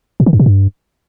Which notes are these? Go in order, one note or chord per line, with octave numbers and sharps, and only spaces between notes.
A#2
D#3
G2
B2
G2